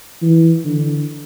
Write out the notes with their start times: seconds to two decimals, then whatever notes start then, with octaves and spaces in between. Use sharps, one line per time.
0.22 E3
0.65 D3